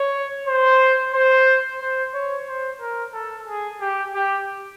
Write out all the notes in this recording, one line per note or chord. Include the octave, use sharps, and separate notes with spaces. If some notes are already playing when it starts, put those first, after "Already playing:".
Already playing: C#5
C5
C5
C5
C#5
C5
A#4
A4
G#4
G4
G4